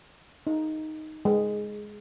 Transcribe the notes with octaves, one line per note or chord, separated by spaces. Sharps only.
D#4
G#3